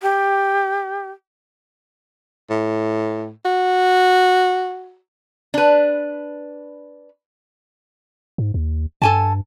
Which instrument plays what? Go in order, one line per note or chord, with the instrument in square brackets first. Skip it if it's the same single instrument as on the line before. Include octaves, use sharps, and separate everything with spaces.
[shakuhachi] G4
[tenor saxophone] A2
F#4
[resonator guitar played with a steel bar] D4 B4
[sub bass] G#2
D#2
[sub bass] G2 [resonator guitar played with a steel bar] A4 G#5 A5